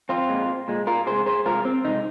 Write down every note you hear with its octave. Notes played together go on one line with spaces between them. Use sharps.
C4 F4
A#2 G#3
A#2 G#3
F4 A#4
C3 G#3 G#4 C5
G#4 C5
C3 G#3 F4 A#4
C4
C3 F3 G#3 D#4